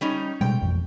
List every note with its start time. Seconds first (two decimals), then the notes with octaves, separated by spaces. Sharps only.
0.01 G3 C#4 D#4
0.41 B2 G3 G#3 G5
0.62 A1 F2